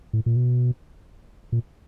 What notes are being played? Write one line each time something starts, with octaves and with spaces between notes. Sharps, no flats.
A2
A#2
B2
A#2